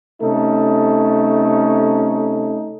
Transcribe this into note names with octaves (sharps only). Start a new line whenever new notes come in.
C3 A3 C#4 D#4 A4